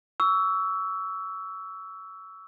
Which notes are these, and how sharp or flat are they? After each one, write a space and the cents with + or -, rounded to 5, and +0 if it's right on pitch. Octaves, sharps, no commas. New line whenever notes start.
C#6 +30 E6 +0